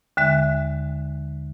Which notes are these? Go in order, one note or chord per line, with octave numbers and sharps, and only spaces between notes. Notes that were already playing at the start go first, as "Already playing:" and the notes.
D#2 D3 G#3 E5